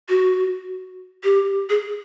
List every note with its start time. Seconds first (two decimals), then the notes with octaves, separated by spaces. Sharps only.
0.09 F#4
1.24 G4
1.70 G#4